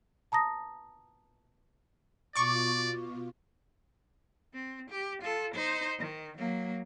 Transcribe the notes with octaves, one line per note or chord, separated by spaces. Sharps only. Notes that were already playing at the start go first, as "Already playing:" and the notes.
A5 A#5 D#6 A#6
B2 F4 D5 C#6 D6
C4
G4
F4 A4
D#4 C5
D#3
F#3 A#3